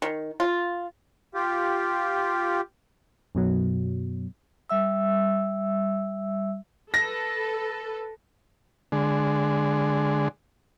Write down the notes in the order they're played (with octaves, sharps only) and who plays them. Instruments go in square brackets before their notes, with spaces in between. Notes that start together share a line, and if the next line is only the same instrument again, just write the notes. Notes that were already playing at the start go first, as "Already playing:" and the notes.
[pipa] D#3
F4
[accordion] F4 G4
[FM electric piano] F#2 B2 F#3
[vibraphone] G3 E5 E6
[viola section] A4 B4 [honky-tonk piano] A#6
[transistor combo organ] D3 G#3